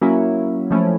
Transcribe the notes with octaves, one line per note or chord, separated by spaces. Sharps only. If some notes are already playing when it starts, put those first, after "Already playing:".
F#3 A#3 C#4 E4
F3 A3 C#4 E4